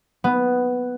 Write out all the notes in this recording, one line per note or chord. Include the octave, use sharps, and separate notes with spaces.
B3